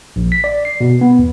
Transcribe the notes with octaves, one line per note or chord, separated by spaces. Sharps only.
A#1
B6
D5
C7
B2
B3
E2